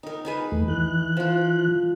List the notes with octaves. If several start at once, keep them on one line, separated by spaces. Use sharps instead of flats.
D#4 A#4
D#4 G#4 B4
E2 A3
E3 F#6
F3 F4